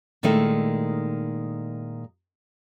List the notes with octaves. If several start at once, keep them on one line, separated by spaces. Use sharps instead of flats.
A#2 D#3 G#3 A3 D#4 E4